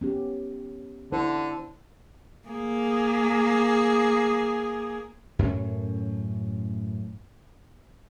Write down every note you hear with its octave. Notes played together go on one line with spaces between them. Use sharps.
B3 C#4 G4
D3 E4 C5
A#3 G#4
F#2 A2 C#4